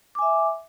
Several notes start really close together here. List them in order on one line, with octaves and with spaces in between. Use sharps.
D6 G#5 E5